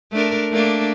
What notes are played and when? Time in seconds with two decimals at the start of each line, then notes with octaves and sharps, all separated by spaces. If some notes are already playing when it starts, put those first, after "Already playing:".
0.13 A3 D4 A#4
0.52 A3 A#3 D4